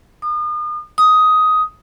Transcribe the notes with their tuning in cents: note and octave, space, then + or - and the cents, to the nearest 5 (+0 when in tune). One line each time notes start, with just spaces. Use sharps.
D#6 -40
D#6 +10